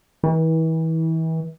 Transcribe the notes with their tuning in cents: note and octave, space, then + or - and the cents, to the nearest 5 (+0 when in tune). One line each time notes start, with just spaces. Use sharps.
E3 -35